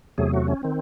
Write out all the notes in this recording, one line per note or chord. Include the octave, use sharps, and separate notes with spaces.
E2 C3 F#3 A3 G#4
F#4
C#4
D#3 C4